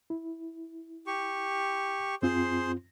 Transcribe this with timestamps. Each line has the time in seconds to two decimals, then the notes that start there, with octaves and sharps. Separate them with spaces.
0.10 E4
1.07 G4 C#6
2.22 F#2 C4 F4 G#4 C5 C6